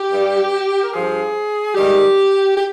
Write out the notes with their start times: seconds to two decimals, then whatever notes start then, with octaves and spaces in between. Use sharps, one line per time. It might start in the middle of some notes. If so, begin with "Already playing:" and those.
Already playing: G4
0.11 G2 G3
0.83 A#4
0.93 G2 F3 G#4
1.74 G#2 D#3 G3 G4
2.56 G4